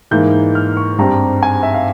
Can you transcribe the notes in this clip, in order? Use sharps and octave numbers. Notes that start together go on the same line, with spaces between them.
G#2 E3 A#3 G6
F6
C#6
G2 G3 C4 A#5
G#5
E5
F5